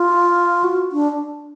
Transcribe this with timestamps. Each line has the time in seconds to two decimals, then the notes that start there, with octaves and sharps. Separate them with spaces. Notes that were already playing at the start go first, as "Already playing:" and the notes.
Already playing: F4
0.64 F#4
0.92 D4